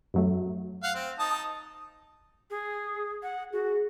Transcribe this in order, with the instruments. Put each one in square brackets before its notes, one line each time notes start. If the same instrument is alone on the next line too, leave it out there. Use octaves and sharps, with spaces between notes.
[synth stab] F#2 F#3 A3
[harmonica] F5 F#5
C4
D#4 A5 D#6
[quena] G#4
F#5
[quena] F#4 [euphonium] G#4